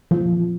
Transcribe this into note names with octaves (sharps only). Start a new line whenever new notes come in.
F3